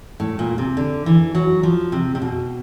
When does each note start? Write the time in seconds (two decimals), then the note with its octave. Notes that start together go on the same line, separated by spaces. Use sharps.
0.20 A2
0.39 A#2
0.58 C3
0.77 D3
1.06 E3
1.35 F#3
1.63 F3
1.92 C3
2.15 C3
2.22 B2